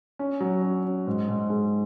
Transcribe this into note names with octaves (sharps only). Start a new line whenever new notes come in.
C#4
F#3
C#4
C#4
G#2
G#2
G#3